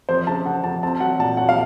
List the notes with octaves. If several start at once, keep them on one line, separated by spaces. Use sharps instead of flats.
F2 C5
C#3 A5
C#3 F#5
F2 A5
C4 A5
F#3 F#5
A#2 A5
F#3 F#5
F5